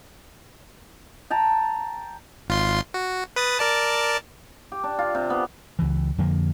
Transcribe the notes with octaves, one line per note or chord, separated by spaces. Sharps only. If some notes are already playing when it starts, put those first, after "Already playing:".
G5 A5 A#5
G#1 F4 C6
F#4
B4 D#6 A6
A#4 D5 A5
G4
D4
F4
C3
B3
C#2 E3
F2 D3 F3 A#3